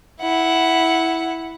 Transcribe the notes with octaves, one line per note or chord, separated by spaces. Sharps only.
E4 F#5